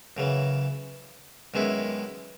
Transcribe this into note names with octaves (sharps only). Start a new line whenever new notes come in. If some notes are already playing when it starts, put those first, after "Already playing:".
F#2 C#3 E3
F#2 D#3 G#3 B3 E4